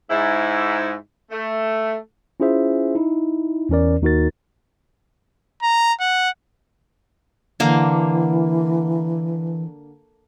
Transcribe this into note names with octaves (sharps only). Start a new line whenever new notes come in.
G#2 E4
A3
C#4 E4 F4 G#4 C5 E5
D#4 E4
E2 E3 C#4 A#4 D5
D#2 D#4 F#4 A#4 A6
A#5
F#5
D3 E3 A#3